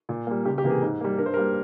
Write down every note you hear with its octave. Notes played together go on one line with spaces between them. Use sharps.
A#2
G3 A#3
C#2 G4
G4
C3 E3 A#3
G#4
G#2
G3 A#3
G2 A#4
C5
A#4
G3 A#3